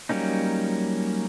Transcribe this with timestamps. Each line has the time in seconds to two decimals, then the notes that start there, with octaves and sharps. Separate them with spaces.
0.09 F#3 G3 A#3 C#4 D#4